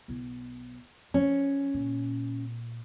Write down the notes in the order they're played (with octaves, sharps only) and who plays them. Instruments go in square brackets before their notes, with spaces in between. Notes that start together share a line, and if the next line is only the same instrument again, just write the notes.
[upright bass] B1 E4
[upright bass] F3 [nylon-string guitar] C#4
[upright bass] A#2